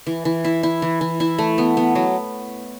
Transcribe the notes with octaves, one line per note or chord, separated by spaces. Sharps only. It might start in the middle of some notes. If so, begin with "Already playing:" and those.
E3
E3
E4
E4
E3
E3
E4
A3
B3
B3
F#3